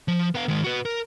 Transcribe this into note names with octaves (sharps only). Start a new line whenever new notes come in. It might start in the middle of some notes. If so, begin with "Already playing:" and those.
F3
B3 F5
D#3 G#3
F#4 B4
A#4